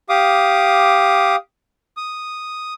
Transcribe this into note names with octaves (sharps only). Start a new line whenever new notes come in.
G4 F5 D6 D#6
D#6